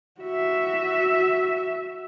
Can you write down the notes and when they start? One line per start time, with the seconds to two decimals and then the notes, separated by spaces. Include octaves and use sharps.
0.21 F#4 E5